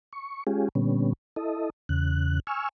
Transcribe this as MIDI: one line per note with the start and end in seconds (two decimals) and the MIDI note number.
0.13 0.44 85
0.47 0.69 56
0.47 0.69 61
0.47 0.69 65
0.47 0.69 67
0.47 0.69 68
0.75 1.13 46
0.75 1.13 50
0.75 1.13 55
0.75 1.13 59
0.75 1.13 61
1.36 1.70 64
1.36 1.70 69
1.36 1.70 75
1.89 2.40 40
1.89 2.40 49
1.89 2.40 90
2.47 2.69 80
2.47 2.69 85
2.47 2.69 88
2.47 2.69 89